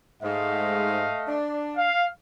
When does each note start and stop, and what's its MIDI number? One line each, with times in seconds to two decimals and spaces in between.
0.23 1.11 44
0.23 1.38 57
0.23 1.38 75
0.23 1.38 77
1.28 1.87 62
1.77 2.05 77